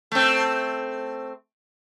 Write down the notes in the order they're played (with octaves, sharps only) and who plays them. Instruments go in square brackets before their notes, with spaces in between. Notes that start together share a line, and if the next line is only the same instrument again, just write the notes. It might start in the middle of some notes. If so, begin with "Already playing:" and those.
[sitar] A3 C4